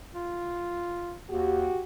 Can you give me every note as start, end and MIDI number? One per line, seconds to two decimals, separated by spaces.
0.15 1.15 65
1.30 1.68 39
1.30 1.83 66
1.30 1.83 67